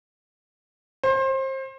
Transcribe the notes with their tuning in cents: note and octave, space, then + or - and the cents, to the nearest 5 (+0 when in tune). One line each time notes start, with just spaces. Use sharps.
C5 +30